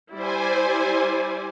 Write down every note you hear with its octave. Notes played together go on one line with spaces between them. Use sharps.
G3 E4 C5 D5 G#5